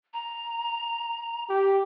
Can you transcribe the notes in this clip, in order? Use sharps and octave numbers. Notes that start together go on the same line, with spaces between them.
A#5
G4